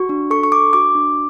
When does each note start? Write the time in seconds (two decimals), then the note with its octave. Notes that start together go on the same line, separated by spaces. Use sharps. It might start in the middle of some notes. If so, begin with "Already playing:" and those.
Already playing: F#4 C#6
0.09 D4
0.30 A4 C#6
0.44 C#6
0.52 D4 D6
0.73 F#4 D6
0.95 D4